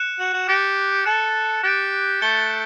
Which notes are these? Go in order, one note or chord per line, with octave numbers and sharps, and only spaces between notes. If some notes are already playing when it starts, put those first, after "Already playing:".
Already playing: F#6 C#7 E7
F#4
F#4
G4 F#6 A6 C#7
A4 F#6 C#7 E7
G4 F#6 A6 D7
A3 G6 C#7 G7